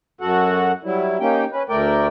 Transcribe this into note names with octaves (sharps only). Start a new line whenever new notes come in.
F#2 F#4 A4 F#5
F#3 G3 E4
A#3 C#4 D#4 G4 G5
C#4 B4
D2 A3 A#4 D5 G5